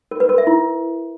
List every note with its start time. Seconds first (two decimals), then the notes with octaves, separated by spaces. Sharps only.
0.11 A#4
0.20 B4
0.29 A#4
0.38 E5
0.47 E4